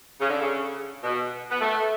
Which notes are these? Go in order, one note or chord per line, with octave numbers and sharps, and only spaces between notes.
C#3
D3
C#3
B2
B3
A3